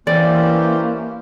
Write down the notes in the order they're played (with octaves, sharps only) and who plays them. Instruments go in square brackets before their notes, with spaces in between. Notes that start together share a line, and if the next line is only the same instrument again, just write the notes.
[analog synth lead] E3 [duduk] A#3 [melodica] C#4 G4 C5 [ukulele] D5